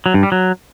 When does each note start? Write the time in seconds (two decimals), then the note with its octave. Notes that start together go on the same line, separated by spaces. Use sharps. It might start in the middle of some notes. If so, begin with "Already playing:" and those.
0.06 F#3
0.14 G2
0.23 G3
0.32 F#3